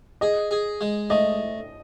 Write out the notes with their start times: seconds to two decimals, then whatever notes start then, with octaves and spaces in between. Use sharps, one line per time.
0.21 G#4 D#5
0.51 G#4
0.81 G#3
1.10 A3 D#5